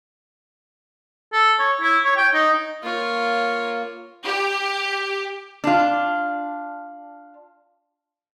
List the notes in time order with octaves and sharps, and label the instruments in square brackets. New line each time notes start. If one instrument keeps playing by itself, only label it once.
[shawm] A4
C#5
E4
C#5
G5
D#4
[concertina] A#3 [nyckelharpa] F4 C#5
[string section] G4
[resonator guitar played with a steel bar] D4 F4